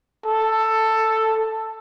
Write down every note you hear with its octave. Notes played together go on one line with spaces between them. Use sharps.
A4